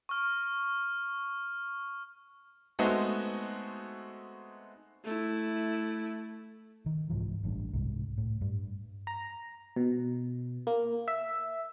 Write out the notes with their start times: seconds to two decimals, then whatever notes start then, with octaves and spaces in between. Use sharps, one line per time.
0.09 C#6 F6
2.79 G#3 A3 B3 C4 D#4 F#4
5.04 A3 E4
6.86 D#3
7.10 C2 G#2 E3 F3
7.43 A1 G2
7.73 C2 G#2
8.18 A2
8.41 G2 G3
9.07 A#5
9.76 B2
10.67 A#3
11.08 E5